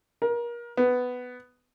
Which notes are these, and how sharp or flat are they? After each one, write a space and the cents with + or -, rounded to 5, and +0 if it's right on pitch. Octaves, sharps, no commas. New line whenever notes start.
A#4 +30
B3 +10